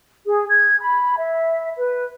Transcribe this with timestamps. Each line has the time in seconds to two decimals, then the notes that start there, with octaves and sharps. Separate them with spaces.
0.25 G#4
0.49 G#6
0.79 B5
1.17 E5
1.76 B4